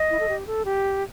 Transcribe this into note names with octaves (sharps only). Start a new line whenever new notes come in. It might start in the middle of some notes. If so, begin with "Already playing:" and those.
Already playing: D#5
E4
A4
G4
A4
G4